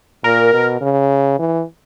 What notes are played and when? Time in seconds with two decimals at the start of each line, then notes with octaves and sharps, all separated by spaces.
0.24 A#2 A#4
0.53 B2
0.81 C#3
1.39 E3